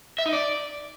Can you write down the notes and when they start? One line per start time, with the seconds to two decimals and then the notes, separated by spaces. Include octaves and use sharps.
0.18 E5
0.26 D#4
0.33 D5